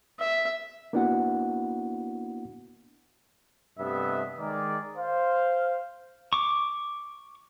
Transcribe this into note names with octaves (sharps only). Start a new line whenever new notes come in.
E5
A#3 B3 D4 E4 F#4 F#5
G2 C3 A3 B3 D#5 E5
D#3 G#3 G#4 A#4 D5
C5 F5
C#6 D6